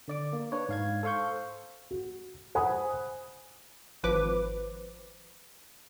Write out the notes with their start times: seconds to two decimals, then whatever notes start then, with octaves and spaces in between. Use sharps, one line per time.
0.08 D3 D5 D6
0.33 A#3
0.52 D4 B4 C#5
0.69 G#2 F5 G#6
1.03 A4 C5 F5 C#6 G6
1.91 F#4
2.55 C5 F#5 G#5 B5 D#6
4.03 G#1 F3 B4 D6